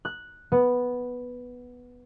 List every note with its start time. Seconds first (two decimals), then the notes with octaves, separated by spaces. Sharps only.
0.05 F#6
0.52 B3